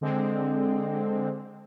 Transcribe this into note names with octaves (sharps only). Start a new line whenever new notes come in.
D3 G#3 C4